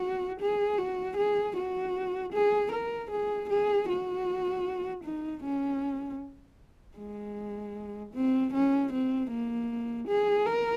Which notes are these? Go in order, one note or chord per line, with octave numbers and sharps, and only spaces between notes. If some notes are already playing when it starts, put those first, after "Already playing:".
Already playing: F#4
G#4
F#4
G#4
F#4
G#4
A#4
G#4
G#4
F#4
D#4
C#4
G#3
C4
C#4
C4
A#3
G#4
A#4